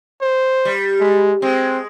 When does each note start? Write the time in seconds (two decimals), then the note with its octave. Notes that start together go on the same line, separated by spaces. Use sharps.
0.21 C5
0.65 G3
1.00 G#3
1.42 G#3 C4